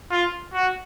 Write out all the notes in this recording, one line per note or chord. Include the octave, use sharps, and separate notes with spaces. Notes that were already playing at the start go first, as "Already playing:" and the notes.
F4
F#4